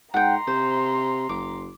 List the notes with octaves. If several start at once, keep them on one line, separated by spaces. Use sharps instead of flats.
G#2 F#5 G5 A#5 C6
C3 C5
F#1 D6